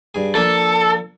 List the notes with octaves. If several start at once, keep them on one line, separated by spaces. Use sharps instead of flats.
G2 G#4
F3 A#3 D4 A4